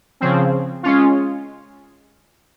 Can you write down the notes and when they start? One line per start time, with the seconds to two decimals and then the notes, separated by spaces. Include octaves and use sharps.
0.21 C#3 F3 C4
0.83 G#3 C#4 F4